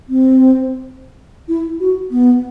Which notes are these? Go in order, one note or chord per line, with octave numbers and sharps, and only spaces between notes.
C4
E4
F#4
B3